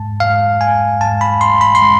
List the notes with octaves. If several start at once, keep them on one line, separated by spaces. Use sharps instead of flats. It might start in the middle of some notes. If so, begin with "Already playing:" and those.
Already playing: G#2 G#3 A5
G#2 G#3 F5
G#5
G#2 G#3 A5
B5
C6
B5
C6
G#3